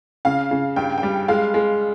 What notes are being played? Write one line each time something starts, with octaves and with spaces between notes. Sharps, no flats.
C#3 F5
C#3
G2 G5
G5
G3
G#3 F5
G#3